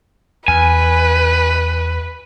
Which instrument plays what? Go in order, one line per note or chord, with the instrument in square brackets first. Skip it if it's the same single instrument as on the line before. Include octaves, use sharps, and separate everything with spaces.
[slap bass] E2 [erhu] B4 [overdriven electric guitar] G#5